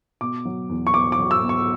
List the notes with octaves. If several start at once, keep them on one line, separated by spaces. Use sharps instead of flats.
B2 D6
F#3
E2
C#6
B2 D6
D6
F#3
E6
B2
C#6